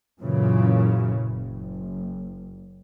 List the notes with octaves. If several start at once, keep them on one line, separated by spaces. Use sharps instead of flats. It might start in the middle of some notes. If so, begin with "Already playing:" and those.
F#2 A#2 C#3 E3
F#1